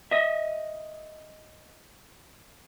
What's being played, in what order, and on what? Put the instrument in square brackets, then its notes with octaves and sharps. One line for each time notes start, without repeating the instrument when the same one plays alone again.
[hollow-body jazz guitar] D#5 E5